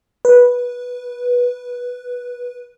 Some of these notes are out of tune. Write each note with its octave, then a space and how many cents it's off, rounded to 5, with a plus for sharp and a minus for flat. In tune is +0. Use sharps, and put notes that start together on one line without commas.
B4 -15